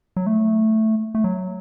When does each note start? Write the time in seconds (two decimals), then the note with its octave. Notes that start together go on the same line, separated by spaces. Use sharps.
0.16 F#3
0.27 A3
1.15 A3
1.24 F#3